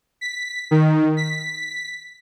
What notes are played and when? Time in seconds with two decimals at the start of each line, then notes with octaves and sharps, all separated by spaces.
0.21 B6
0.71 D#3
1.17 B6